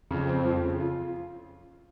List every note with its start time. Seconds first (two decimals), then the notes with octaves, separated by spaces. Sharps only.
0.11 F2 C#3
0.28 C4
0.45 F3
0.62 C#3
0.80 F4